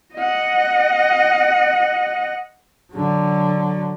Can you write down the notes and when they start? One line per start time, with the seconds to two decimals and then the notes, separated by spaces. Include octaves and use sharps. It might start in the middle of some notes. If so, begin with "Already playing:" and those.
0.14 D#5 F#5
2.93 D3 F#3